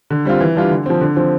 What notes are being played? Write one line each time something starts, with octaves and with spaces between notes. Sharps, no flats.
D3
G3 C4 F4
E3
G3 D4 F4
D3
F3 C4
D3
F3 C4